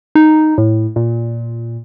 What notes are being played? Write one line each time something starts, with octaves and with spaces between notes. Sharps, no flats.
D#4
A2
A#2